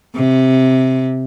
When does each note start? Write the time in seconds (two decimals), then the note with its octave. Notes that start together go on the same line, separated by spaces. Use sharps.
0.16 C3